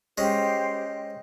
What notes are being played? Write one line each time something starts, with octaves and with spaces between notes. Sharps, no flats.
G#3 C#4 G4 C5